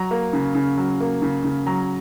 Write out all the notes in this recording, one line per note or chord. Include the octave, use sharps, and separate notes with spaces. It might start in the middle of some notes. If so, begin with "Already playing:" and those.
Already playing: F#3 A#5
A#3
C#3
C#3
F#3
A#3
C#3
C#3
F#3 A#5